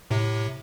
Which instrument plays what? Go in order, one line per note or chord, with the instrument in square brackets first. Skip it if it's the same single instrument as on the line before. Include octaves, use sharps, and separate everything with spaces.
[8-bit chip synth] A2 C3